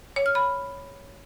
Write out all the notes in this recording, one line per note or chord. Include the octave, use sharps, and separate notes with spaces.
C#5
F6
B5